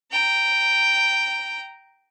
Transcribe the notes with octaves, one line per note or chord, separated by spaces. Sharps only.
G5 A#5